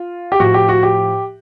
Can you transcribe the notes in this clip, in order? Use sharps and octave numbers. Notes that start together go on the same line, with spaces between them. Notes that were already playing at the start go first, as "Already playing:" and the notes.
Already playing: F4
G4
A2 F3 F#4
G4
F#4
G4